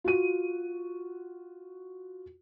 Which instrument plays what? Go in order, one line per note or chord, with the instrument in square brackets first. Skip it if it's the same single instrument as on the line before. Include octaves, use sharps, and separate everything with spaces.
[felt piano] F4 F#4 D#7